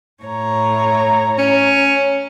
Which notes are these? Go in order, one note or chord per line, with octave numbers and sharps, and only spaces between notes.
A2 C#5 A#5
C#4